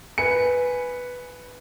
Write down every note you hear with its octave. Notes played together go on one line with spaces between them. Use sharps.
B4 G#5 C#7